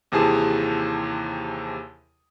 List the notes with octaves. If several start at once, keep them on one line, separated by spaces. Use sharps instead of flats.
D#2 C3 E3 G#4 A5 D#6